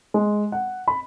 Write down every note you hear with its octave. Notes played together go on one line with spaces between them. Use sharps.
G#3
F#5
B5